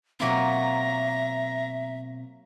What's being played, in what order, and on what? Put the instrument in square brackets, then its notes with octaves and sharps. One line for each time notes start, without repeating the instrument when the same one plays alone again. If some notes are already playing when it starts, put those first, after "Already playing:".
[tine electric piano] B2 C4 [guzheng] F#3 A#3 F4 [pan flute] E5 [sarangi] A#5